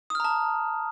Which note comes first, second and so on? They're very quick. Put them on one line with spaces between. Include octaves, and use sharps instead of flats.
D#6 F6 A#5 A5